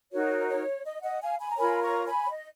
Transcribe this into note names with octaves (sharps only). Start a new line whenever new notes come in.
D#4 F#4 A#4 C#5
C#5
D#5
D#5 F#5
F5 G#5
G#5 B5
A#5
F4 A#4 C#5 G#5 B5
A#5 C#6
G#5 B5
C#5
D#5